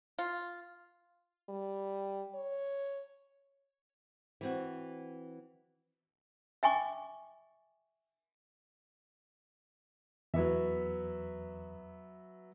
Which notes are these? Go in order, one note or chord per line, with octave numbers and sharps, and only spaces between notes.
F4
G3
C#5
E3 C4 F#4
E5 G5 G#5 C#6 D6
E2 F#3 B3 E5